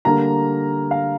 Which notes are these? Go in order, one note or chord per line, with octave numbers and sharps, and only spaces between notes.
D3 G3 A#3 A#5
F5